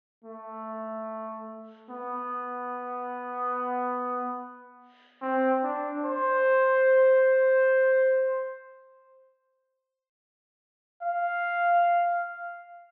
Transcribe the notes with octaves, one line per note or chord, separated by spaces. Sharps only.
A3
B3
C4
D4
C5
F5